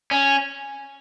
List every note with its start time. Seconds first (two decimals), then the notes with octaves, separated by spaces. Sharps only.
0.11 C#4